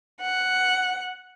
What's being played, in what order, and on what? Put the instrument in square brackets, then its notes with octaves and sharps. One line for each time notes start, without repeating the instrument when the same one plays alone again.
[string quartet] F#5